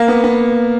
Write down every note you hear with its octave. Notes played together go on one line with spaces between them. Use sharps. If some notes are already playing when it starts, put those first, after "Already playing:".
Already playing: A#3
B3
B3